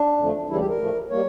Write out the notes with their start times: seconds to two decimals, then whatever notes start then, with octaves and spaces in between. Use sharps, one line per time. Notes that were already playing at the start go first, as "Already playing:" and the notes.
Already playing: D4
0.18 F2 D3 F3 A3
0.49 D2 C#3 E3 G3 E4
0.59 G4
0.69 A#4
0.79 A2 F3 A3
1.10 G3 A#3 C#5